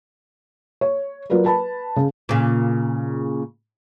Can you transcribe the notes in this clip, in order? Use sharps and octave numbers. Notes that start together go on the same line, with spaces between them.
C#5
F#3 F4 A#4 B4 D5
B4 A5 B5
C#3
A#2 C#3